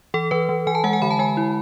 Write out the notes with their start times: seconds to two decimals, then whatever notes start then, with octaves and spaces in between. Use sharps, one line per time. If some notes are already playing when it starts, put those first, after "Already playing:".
0.14 E3 A4
0.31 E3 B4
0.49 E3
0.67 E3 G#5
0.75 A5
0.84 G#3 F#5
0.93 G#5
1.02 D3 B5
1.11 A5
1.19 G#3 G#5
1.37 E4